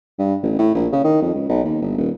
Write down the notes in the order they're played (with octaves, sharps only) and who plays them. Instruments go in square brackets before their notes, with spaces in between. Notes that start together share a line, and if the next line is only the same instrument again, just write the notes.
[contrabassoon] G2
A1
A2
A#1
C#3
D#3
F2
C#2
B1
D#2
G1
D#1